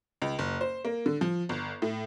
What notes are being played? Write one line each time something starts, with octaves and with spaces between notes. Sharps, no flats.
C#2
F#1
C5
A#3
D3
F3
G1
A2